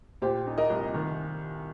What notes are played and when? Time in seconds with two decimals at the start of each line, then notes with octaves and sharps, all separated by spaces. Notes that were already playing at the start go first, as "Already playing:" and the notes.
0.22 A#2 G4 C5
0.47 D#4
0.58 A#4 D#5
0.70 C2
0.94 D#3